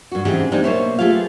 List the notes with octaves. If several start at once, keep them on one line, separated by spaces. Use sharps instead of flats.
G2 F#4
G#2 C#3 E3 C4 G4 G#4
G3 G#3 A#3 C4 D4 D#4
B2 A#3 C5 C#5 E5
A3 F4 G4 G#4 B4 F5